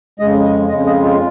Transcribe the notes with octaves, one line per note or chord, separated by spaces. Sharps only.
F2 C#3 G#3 D#5
D#5
F2 C#3 G#3 D#5
D#5
F4